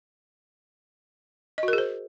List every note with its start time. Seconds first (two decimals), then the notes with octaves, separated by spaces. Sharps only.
1.58 D#5
1.63 F#4
1.68 A#4
1.73 G#4
1.78 C5